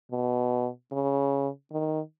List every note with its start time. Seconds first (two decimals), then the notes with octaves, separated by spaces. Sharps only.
0.12 B2
0.92 C#3
1.72 D#3